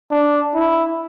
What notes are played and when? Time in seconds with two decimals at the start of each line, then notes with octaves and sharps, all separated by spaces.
0.11 D4
0.55 E4